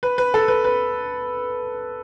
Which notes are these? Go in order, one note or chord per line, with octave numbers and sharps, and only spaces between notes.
B4
B4
A4
B4
B4